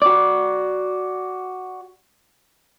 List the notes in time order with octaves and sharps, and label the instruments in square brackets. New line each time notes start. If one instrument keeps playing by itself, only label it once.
[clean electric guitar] F#4 D5